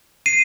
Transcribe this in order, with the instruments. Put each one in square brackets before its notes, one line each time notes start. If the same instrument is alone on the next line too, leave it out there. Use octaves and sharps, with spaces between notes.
[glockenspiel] C7 D#7